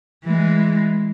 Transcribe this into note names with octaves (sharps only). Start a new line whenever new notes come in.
E3 G#3